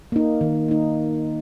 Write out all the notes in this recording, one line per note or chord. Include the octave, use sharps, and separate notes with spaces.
A#3 D#4
D#3
A#3 D#4